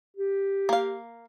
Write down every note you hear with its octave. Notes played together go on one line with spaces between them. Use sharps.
G4
A#3 F5